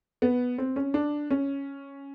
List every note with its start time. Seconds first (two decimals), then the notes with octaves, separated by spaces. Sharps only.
0.22 B3
0.58 C4
0.76 C#4
0.94 D4
1.31 C#4